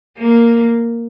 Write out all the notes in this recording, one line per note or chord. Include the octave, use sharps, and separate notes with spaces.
A#3